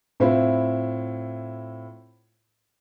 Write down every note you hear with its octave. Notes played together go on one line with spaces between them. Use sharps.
A2 C4 E4 F4